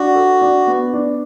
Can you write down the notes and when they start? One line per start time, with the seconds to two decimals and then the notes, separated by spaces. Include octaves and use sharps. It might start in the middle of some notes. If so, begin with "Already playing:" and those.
Already playing: D4 F#4
0.15 A4
0.41 D4
0.67 B3
0.93 D4